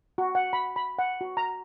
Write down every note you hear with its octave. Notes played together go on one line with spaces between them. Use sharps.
F#4
F#5
B5
B5
F#5
F#4
A#5